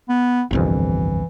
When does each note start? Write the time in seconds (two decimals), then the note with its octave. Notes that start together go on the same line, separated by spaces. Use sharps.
0.09 B3
0.51 G1 C2 F2 E3